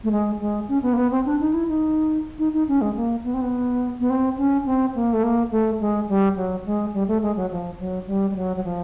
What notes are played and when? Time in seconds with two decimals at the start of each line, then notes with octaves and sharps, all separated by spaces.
0.04 A3
0.11 G#3
0.40 G#3
0.69 C#4
0.82 B3
0.93 A#3
0.97 B3
1.11 C4
1.26 D4
1.40 D#4
1.54 E4
1.68 D#4
2.39 D#4
2.54 D#4
2.68 C#4
2.81 G#3
2.96 A#3
3.24 B3
3.34 C4
3.42 B3
4.00 B3
4.10 C4
4.38 C#4
4.66 C4
4.95 A#3
5.13 A3
5.23 A#3
5.51 A3
5.81 G#3
6.09 G3
6.36 F#3
6.66 G#3
6.94 G3
7.08 A3
7.22 G#3
7.37 F#3
7.51 F3
7.79 F#3
8.07 G3
8.31 G3
8.36 F#3
8.56 F#3
8.64 F3